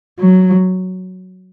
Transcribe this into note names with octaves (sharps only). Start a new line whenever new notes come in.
F#3